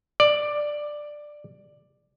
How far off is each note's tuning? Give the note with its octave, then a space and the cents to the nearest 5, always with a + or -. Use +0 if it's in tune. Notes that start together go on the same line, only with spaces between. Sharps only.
D5 +10